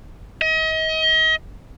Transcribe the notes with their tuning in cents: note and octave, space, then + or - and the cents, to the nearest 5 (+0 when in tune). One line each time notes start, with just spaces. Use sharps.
D#5 +35